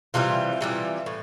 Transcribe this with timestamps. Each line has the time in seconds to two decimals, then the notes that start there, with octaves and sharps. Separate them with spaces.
0.14 C3 E3 G3 F4
0.61 C3 E3 G3
1.06 A2